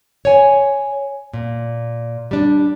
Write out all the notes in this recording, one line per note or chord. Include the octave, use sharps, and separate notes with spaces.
C#5 G#5
A#2
G3 D4